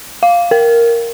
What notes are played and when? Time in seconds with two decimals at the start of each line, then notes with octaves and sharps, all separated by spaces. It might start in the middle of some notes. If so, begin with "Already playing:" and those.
0.23 F5
0.51 A#4